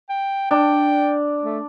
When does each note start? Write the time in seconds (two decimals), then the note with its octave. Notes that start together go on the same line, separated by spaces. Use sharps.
0.09 G5
0.51 D4 G5
1.43 A3